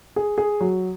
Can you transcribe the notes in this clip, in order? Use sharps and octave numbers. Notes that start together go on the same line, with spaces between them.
G#4
G#4
F#3